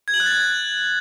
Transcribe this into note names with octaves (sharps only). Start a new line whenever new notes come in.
G#6
F#7
F#6
A6
G#6